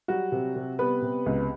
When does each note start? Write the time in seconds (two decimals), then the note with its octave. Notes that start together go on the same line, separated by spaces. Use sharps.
0.08 F#3 G3 F#4
0.32 C3
0.56 C3
0.79 G3 B3 B4
1.02 C3
1.26 C#2